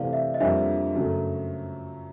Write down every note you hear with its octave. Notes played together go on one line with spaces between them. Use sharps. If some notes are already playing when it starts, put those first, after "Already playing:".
Already playing: C3 E3 A3 D5 F5
E5
D#5
F2 D3 G3 A#3 D4 E5
F#2 C#3 F#3 A3